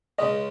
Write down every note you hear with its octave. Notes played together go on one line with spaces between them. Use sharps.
C#2 C#3 G#3 C#4 D#5